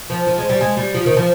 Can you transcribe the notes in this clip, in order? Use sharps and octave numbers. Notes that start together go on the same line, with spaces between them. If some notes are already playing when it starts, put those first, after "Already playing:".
F3
F3
G#3
G3
G#3
G3
F3
D#3
F3